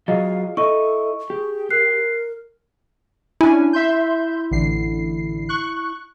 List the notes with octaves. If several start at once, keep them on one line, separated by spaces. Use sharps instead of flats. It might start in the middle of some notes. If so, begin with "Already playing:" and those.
F#3 F4 G#4 D#5 F5
E4 A4 D#5 C#6
G4 G#4
A#4 F#6 C7
C#4 D4 E4 G#5
E5 C6 G6
A1 D3 C7
C#6 F#6